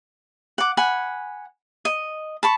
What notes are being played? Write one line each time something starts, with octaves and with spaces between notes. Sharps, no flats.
F#5 D6
F#5 G#5 B5
D#5
A5 B5 C#6